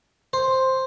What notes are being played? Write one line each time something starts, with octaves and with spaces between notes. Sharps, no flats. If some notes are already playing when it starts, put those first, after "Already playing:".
C5